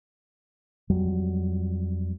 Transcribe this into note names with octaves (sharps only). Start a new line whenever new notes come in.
F2 F#3 G3